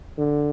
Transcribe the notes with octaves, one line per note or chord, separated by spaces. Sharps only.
D3